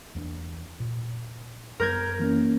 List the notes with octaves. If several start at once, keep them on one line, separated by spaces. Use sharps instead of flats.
E2 A#3 D4
A#2
F#2 G3 B3 A#4 G6 G#6
E3 A#3 C#4